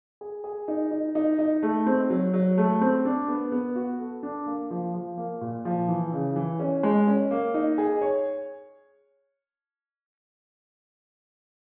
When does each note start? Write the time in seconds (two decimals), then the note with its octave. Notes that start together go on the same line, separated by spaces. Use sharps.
0.21 G#4
0.44 G#4
0.68 D#4
0.91 D#4
1.15 D#4
1.39 D#4
1.63 A3
1.86 C4
2.10 F#3
2.33 F#3
2.58 A3
2.81 C4
3.05 D4
3.28 B3
3.52 B3
3.76 F#4
3.99 A4
4.23 D4
4.46 A#3
4.71 F3
4.94 F3
5.17 A#3
5.41 A#2
5.65 F3
5.88 E3
6.12 C#3
6.36 E3
6.60 C#4
6.83 G#3
7.07 C#4
7.31 A#3
7.54 D#4
7.78 G#4
8.01 C#5